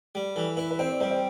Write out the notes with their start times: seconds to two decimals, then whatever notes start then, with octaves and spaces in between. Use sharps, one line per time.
0.15 G3
0.36 E3 A4
0.57 E4 B4
0.71 B4
0.79 C4 C5
0.90 D5
1.00 G3 C5
1.11 C5